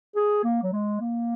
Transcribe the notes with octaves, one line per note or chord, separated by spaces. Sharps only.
G#4
A#3
F#3
G#3
A#3